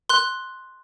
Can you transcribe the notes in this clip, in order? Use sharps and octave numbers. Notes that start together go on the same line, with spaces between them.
C6 F#6